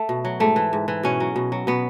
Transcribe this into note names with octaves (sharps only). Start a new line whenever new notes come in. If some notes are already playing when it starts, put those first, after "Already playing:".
Already playing: A3
B2
F#3
G#2 A3
E3
G#2
E3
B2 C#4
F#3
B2
F#3
B2 B3